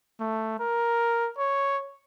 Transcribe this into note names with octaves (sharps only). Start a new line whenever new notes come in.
A3
A#4
C#5